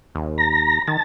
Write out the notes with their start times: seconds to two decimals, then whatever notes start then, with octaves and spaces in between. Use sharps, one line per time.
0.15 D#2
0.38 A#5
0.88 D#3 A5